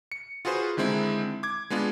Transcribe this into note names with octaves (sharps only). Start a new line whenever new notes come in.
C#7
F4 F#4 G#4 B4 C5
D3 D#3 G#3 C4 E4
D6 G#6
G#3 B3 D4 F4